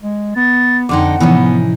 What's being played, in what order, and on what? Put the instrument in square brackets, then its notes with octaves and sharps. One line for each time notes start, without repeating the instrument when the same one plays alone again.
[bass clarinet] G#3
[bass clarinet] B3 [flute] A6
[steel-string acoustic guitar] F2 D3 D#4 [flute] F#5 [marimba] G5 C6 D6
[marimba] A2 C3 F3 [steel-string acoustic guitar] E3 C#4 D#4 [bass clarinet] B3